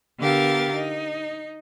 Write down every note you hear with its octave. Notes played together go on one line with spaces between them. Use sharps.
D3 B3 G4 A#4 F5 A6
D#4